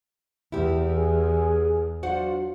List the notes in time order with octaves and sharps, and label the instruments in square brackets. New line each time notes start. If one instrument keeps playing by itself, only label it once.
[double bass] E2 [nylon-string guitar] E4 G4
[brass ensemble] G#4
[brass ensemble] F#3 D4 F4 [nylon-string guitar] F#4 C5 F#5